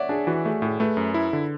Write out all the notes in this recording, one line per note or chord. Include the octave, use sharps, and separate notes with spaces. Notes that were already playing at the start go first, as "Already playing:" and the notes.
Already playing: C#5 D5 E5 F#5
D4 G#4
E3 F#4
A3 G#4
A2 G#4
A3 G#4 B4
F#2
E4
D3